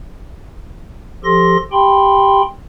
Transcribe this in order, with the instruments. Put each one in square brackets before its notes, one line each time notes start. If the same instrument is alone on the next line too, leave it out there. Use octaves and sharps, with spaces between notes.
[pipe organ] F3 G4 A4 C6 A#6
G4 G5 B5 C6